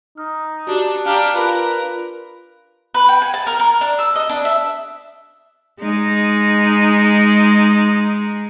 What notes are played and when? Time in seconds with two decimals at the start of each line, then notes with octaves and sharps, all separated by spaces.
0.18 D#4 F6
0.67 D4 F#4 G4
1.06 D4 G4 F5 A5 A#5 F6
1.35 F4 A#4 B4
2.94 B4
3.09 G5
3.22 G#5
3.34 A5
3.47 A#4
3.60 A#4
3.81 D4
3.99 E6
4.16 D#5
4.29 D4
4.45 E5
5.80 G#3 D#4